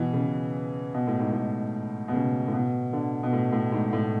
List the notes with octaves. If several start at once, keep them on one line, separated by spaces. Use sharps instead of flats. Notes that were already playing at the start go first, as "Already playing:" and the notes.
Already playing: B2 E3
C#3
B2
A2
G#2
A2
B2
C#3
A2
B2
D3
B2
A2
A2
G#2
A2